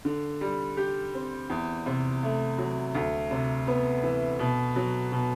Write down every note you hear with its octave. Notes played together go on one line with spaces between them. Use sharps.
D3
G3
G4
C4
E2
C3
A3
F#3
D2
C3
B3
E3
B2
F#3
B2